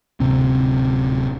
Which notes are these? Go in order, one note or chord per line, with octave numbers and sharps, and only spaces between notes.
D1 C3 C4